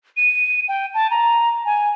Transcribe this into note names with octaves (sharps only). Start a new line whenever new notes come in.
D#7
G5
A5
A#5
G#5